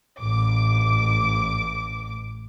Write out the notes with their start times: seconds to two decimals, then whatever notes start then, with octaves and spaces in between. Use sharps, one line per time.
0.18 A1 D6